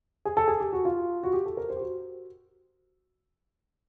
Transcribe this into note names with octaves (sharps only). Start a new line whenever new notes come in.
G#4
A4
G#4
G4
F#4
F4
F#4
G4
A4
A#4
C5
G4
F#4